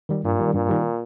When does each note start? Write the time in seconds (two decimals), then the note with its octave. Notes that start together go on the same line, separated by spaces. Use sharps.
0.09 D#3 G3
0.24 G2 A#2
0.39 D#3 G3
0.54 G2 A#2
0.69 D#3 G3